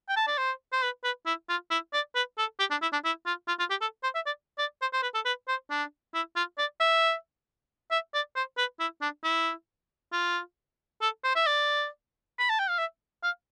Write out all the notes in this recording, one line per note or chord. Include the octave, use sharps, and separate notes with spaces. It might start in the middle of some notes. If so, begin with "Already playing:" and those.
G5
A5
D5
C5
C5
B4
B4
E4
F4
E4
D5
B4
A4
G4
D4
E4
D4
E4
F4
F4
F4
G4
A4
C5
E5
D5
D5
C5
C5
B4
A4
B4
C5
D4
E4
F4
D5
E5
E5
D5
C5
B4
E4
D4
E4
F4
A4
C5
E5
D5
B5
A5
G5
F5
E5
F5